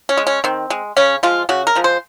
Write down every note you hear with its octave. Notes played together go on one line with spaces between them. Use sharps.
C#4
G#3
C#4
D#3 C4
G#3
C#3 C#4
F3 G#3 F4
C#3 F#4
A#4
F3 G#3
C5